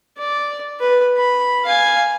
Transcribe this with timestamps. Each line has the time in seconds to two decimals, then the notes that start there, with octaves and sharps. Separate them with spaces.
0.18 D5
0.80 B4
1.17 B5
1.65 F5 G#5